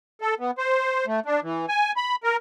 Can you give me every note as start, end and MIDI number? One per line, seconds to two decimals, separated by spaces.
0.21 0.35 69
0.40 0.51 59
0.58 1.06 72
1.07 1.20 57
1.26 1.40 62
1.43 1.66 52
1.68 1.92 80
1.97 2.16 83
2.24 2.37 70